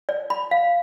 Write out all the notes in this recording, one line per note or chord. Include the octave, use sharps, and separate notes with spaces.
D5
B5
F5